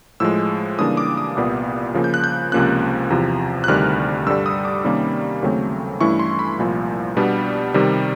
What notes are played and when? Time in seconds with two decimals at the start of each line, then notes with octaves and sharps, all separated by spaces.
0.20 A2 F3 G#3 E6
0.78 C#3 E3 G3 A#3 D4 D#6
0.97 D6
1.17 D#6
1.37 C2 A#2 G3 B3
1.94 C#3 F3 A#3
2.04 G6
2.14 F#6
2.24 G6
2.52 C#2 C3 F3 A#3 C#4 F#6
3.10 E2 C3 F3
3.64 F#6
3.68 D2 C3 D#3 G3 F6
4.26 G2 D3 G3 E6
4.46 D#6
4.65 D6
4.84 C3 D#3 G3 A#3 C#4
5.42 D#2 C#3 F#3 A3 C4
6.00 G2 E3 A3 C#4 E4 C#6
6.19 C6
6.39 B5
6.59 C2 A#2 F3
7.17 B2 G3 B3 D4
7.74 C3 D#3 G3